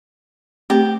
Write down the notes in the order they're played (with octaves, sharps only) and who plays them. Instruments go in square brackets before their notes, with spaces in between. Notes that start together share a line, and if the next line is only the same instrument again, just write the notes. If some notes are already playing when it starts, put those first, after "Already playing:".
[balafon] A3 C4 [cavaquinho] G4